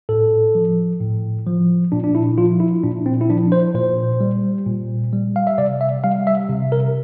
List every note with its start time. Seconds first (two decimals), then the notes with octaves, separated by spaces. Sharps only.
0.09 A2 A4
0.55 F3
1.01 A2
1.46 F3
1.92 A#2 D4
2.04 D4
2.15 E4
2.38 F3 F4
2.60 E4
2.83 A#2 D4
3.06 C4
3.21 E4
3.30 F3 D4
3.52 C5
3.75 A#2 C5
4.21 G3
4.66 A#2
5.13 G3
5.36 F5
5.47 E5
5.58 C3 D5
5.81 E5
6.04 G3 F5
6.27 E5
6.49 C3
6.72 A#4